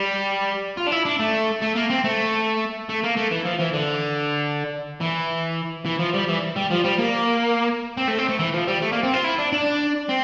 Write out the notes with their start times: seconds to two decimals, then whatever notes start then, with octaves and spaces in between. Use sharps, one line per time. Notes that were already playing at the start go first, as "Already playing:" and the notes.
Already playing: G3
0.77 F4
0.87 D4
0.92 E4
1.05 D4
1.19 A3
1.62 A3
1.76 A#3
1.90 C4
2.04 A3
2.89 A3
3.03 A#3
3.17 A3
3.31 E3
3.45 F3
3.59 E3
3.74 D3
5.01 E3
5.86 E3
6.00 F3
6.14 G3
6.28 E3
6.56 G3
6.70 F3
6.84 G3
6.99 A#3
7.97 C4
8.08 A3
8.18 C4
8.29 A3
8.39 E3
8.54 F3
8.68 G3
8.82 A3
8.92 A#3
9.03 C4
9.14 F4
9.24 E4
9.39 D4
9.52 D4
10.09 C4